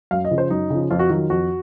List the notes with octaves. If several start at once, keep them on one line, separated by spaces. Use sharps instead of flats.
F#2 F5
D#5
C#3 F3
C5
F#2 D#4
C#3 F3
F2 F4
F#4
D#3 F#3 F4
F2 F#4